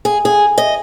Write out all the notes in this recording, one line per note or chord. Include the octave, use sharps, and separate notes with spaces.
G#4
G#4
D#5